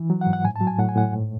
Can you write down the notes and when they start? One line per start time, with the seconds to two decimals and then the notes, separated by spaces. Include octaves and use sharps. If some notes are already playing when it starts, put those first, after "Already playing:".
Already playing: E3
0.10 F#3
0.21 F#5
0.26 G#2
0.33 F#5
0.45 A2 G#5
0.56 A5
0.61 F#3
0.67 G#5
0.79 A2 F#5
0.89 G#5
0.96 A2 F#5
1.13 G#2